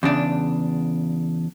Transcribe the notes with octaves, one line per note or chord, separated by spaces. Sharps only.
E2 C#3 D4